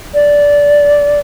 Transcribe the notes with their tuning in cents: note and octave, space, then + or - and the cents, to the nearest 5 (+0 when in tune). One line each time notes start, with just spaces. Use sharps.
D5 -15